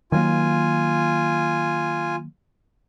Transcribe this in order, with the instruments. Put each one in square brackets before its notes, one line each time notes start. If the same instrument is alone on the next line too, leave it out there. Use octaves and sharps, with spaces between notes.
[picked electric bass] D#3 F#3 A#3 [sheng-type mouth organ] F4 G#5